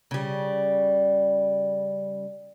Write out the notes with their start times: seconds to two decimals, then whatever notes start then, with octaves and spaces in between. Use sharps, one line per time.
0.11 C#3 G3